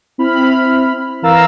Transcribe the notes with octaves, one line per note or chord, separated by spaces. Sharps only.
C4 E4 B5 F6
E3 A#4 F5 A#5 E6 A6